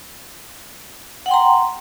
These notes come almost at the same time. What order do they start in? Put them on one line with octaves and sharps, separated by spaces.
F#5 G5 C6 A#5